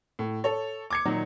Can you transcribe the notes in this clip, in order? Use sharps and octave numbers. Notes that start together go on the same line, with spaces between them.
A2
A4 C#5
D6 G#6 C#7
A#2 D#3 F#3